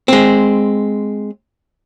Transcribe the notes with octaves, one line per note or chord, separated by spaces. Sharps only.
G#3 C4